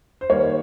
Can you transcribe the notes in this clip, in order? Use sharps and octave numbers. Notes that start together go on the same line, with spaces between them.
C5
D#3 G3 A#3 C#5